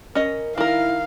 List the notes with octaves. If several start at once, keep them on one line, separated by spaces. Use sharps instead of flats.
C#4 A#4 D#5
D#3 E4 A#4 F5